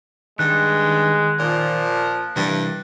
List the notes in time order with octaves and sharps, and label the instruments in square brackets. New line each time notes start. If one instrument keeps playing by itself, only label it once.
[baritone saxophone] G2 [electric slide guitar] D#3 [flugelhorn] G#3 [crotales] F#6
[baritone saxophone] A#2 [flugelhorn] F3
[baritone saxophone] G2 [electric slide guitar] C3 E3 G3